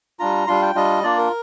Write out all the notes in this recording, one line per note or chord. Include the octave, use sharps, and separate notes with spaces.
G3 D4 F4 A#5
G3 D4 F4 C6
G5
G3 D4 F4 D#5
A#3 D4 F4 D5
A#4